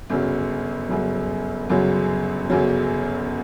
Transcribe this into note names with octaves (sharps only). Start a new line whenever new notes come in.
G1 F#2 C#3 F#3
G1 F#2 C#3 F#3
G1 F#2 C#3 F#3
G1 F#2 C#3 F#3